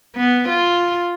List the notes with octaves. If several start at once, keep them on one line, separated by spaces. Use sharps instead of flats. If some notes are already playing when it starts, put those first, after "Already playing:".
B3
F4